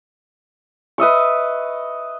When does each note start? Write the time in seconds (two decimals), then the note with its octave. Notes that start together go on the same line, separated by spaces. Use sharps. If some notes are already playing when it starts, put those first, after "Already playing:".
0.98 B4 D#5 E5 C#6